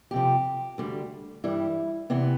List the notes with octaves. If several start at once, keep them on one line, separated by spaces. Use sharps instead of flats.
F2 C3 F3 G4
D2 D3 G3
G2 E3 G3 E4
E2 C3 E3 B3